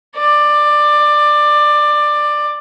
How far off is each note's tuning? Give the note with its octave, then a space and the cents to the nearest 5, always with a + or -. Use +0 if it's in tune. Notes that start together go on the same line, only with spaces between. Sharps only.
D5 +15